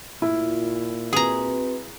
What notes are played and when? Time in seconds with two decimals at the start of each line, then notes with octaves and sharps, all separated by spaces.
0.22 A#2 E4 F4
1.13 C4 F#4 G#4 B4 A#5